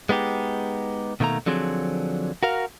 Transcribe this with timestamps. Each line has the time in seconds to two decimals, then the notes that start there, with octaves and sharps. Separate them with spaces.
0.09 G#3 B3 D#4 G4
1.20 B2 D#3 A3 A#3 A#5
1.46 D3 F3 F#3 C4 G#4
2.43 F#4 A#4 F5